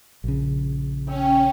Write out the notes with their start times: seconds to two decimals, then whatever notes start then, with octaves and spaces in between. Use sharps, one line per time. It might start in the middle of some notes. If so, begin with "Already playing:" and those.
0.24 A#1 C#3
1.07 C#4 G5 E6